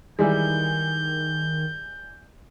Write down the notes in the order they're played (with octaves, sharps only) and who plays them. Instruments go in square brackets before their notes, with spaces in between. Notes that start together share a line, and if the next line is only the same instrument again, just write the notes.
[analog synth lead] D#3 [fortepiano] E3 G3 G#3 [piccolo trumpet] G6